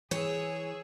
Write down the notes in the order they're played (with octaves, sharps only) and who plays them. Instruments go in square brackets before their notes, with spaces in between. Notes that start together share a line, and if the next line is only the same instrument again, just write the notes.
[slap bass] E3 [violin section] G#4 E6 [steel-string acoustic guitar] C#5